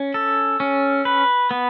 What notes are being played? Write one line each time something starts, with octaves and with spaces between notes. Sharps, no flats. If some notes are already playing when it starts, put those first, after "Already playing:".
Already playing: C#4
A4
C#4
B4
B3